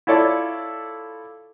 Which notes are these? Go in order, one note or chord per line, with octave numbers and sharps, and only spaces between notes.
E4 F4 A4 C#5 D5